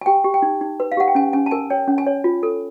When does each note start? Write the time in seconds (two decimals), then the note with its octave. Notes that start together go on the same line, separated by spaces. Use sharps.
0.01 G#5
0.06 G4 G5
0.24 G4
0.34 G5
0.42 D#4
0.61 D#4
0.80 B4
0.92 F5
0.97 G4 F#5
1.08 G5
1.15 C#4 G#5
1.33 C#4 G#5
1.46 A5
1.51 A#4 G#5
1.70 C#5 G5
1.88 C#4
1.98 G#5
2.06 C#5
2.24 F4
2.43 A4